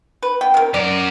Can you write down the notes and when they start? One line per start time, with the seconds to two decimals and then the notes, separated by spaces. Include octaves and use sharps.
0.23 B4
0.41 B3 G5
0.54 C3 A#4
0.74 F#2 A#4 D5